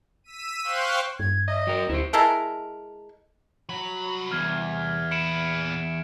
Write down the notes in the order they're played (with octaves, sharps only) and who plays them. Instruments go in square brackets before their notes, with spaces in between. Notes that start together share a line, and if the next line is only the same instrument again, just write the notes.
[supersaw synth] E6 B6 D#7
C5 F5 G5 C6 C#6 F#6
[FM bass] G2 [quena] G#6
[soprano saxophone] D#5 [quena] E5
[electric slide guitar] F#3 A#4 [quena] G5
[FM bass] D2 [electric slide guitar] E4 G4 [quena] C5
[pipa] G#3 E4 A4 A#4
[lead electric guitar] C2 B5 [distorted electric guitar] F#3
[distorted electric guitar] E2 [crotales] F6 G#6
[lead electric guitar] A#2 B3 [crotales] C#7 D7 E7